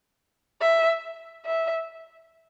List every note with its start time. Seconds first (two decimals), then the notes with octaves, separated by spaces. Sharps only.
0.61 E5
1.45 E5